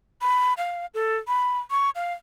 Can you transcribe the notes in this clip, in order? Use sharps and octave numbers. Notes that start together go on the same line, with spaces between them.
B5
F5
A4
B5
C#6
F5